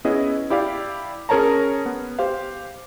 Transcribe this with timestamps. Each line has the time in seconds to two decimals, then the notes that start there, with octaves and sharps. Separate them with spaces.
0.05 B3 C#4 E4 G#4 D#5
0.50 E4 G4 D5 F5
1.29 C#4 G#4 A#4 C#5 A5 A#5
1.86 B3
2.19 G4 C5 F5